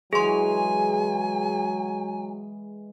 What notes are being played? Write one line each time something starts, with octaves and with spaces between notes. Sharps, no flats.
E3 F#3 G#3 G#4 G#5 C6